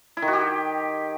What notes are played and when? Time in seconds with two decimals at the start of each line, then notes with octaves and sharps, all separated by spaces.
0.17 E4
0.22 D#3
0.28 F#4
0.33 G4